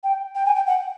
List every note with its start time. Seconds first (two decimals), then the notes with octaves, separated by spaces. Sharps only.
0.04 G5
0.35 G5
0.45 G#5
0.55 G5
0.67 F#5